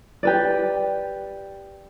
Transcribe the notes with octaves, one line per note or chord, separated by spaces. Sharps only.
G4 B4 D5